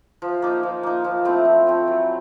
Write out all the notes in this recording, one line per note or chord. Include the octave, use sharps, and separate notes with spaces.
F3
A#3 D#4
F3
A#3 D#4
F3
A3 C4 E4
F3
A3 C4 E4
F#3